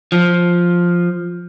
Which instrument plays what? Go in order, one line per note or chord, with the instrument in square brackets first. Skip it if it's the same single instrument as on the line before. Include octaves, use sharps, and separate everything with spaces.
[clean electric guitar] F3